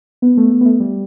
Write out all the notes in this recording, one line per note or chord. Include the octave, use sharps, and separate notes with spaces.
B3
A3
A3
B3
A3
G3